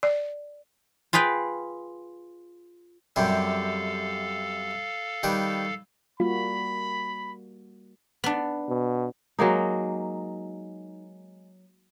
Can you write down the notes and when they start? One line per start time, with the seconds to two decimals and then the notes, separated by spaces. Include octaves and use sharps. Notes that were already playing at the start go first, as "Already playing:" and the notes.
0.03 D5
1.13 F4 G#4 B4 F5 G5
3.16 F#2 C3 G3 A4 F5
5.23 D#3 G3 B4
6.20 G3 A#3 F4 F#4 B5
8.24 B3 D4
8.69 B2
9.39 F#3 G#3 A#3 D#4